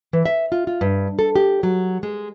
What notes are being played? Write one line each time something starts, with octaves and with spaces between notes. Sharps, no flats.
E3
E5
F4
F4
G2
A4
G4
F#3
G#3